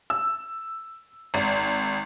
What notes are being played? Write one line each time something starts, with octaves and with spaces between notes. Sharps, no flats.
E6
G#1